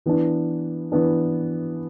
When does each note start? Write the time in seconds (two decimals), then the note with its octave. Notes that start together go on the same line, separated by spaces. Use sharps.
0.06 E3 B3 D4
0.92 E3 B3 D4